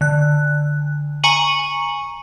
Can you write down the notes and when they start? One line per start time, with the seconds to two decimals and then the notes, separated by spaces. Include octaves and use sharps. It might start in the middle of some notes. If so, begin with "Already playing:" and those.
0.01 D3 F#6
1.24 G#5 A#5 C#6 C#7 D#7 F#7